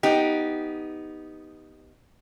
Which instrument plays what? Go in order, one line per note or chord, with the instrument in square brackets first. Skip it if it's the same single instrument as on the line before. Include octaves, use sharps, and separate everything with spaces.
[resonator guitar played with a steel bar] B3 D#4 G4